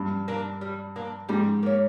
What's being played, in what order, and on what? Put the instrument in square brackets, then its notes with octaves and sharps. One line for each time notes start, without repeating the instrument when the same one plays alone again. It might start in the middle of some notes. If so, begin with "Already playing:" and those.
Already playing: [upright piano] G2
[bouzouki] A#3 D4
G3
A#3 D4
[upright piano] G#2 [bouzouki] G3
[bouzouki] A#3 C#4